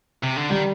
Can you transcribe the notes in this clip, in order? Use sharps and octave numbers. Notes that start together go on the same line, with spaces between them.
C3
D3
D#3 G3